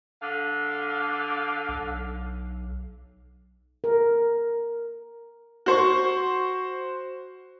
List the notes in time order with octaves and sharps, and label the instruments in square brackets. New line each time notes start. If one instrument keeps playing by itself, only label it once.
[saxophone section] D3 F5
[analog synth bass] B1
[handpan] A#4
[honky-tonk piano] F#4 C5 C#6